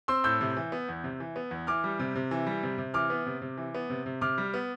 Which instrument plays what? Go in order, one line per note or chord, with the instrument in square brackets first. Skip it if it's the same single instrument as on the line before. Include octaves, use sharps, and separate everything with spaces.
[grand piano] C4 C6 E6
A2 E6 G6
C3
E3
B3
E2
C3
E3
B3
E2
E3 D6 F6
G3
C3
C3
E3
G3
C3
C3
E3 D6 F6
B3
C3
C3
E3
B3
C3
C3
C3 D6 F6
G3
B3